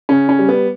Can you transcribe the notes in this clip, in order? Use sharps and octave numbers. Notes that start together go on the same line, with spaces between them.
C#3 C#4
C#4
G3
B3